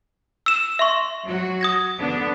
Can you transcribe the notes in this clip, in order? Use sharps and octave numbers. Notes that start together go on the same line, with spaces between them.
E6 E7
E5 C6 C#6
F#3 F#4
D#6 G#6 A#6
D3 B3 D4